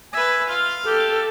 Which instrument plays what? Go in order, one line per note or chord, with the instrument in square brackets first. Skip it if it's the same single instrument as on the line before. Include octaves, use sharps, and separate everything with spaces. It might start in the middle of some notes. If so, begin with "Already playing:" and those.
[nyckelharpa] B4 E5 [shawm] G#5
[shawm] F4 [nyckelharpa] F5
[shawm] G4 [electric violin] A4